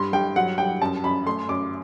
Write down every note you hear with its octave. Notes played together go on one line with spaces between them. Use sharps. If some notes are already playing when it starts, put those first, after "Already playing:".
Already playing: G2 C6
G2 G5
F#3 F#5
G2 G5
F#2 A5
F#2 B5
A3 C6
F#2 D6